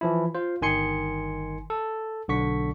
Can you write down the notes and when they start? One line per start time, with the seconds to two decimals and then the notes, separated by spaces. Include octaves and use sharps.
0.01 E3 F3 E4
0.35 F4 C5
0.62 G1 D#3 G#5 C6 C#7
1.70 A4
2.28 B1 D3 C#6 B6